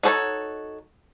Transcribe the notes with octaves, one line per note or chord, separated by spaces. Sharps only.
D#4 F#4 A4 C5 C#5